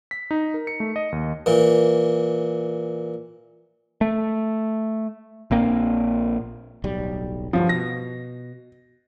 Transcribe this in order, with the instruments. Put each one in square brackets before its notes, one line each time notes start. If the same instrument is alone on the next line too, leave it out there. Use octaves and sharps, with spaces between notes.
[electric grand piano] B6
D#4
A#4
C#7
A3
D#5
D#2
[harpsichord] A#2 E3
[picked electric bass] A3
A#1 A#2 A#3 C4
[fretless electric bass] D1 B1 G3
[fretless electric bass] D2 G2 F#3 [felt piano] F3
[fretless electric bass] B2 [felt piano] A#6